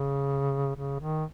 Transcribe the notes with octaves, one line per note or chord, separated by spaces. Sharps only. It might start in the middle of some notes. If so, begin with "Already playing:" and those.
Already playing: C#3
C#3
D#3